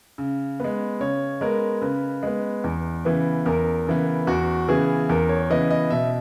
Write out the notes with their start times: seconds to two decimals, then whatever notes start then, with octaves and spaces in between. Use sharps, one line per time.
0.18 C#3
0.60 G#3 B3
1.00 C#3 C#5
1.41 G#3 B3 A#4
1.81 C#3 B4
2.23 G#3 B3
2.64 E2
3.05 C#3 E3 B3
3.45 E2 A#4
3.87 C#3 E3 B3
4.27 E2 F#4
4.68 C#3 E3 B3 G#4
5.09 E2 A#4
5.29 C#5
5.50 C#3 E3 B3 D#5
5.71 D#5
5.90 B2 E5